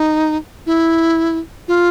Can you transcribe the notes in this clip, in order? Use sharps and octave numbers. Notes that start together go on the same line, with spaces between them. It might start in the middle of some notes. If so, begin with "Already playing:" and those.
Already playing: D#4
E4
F4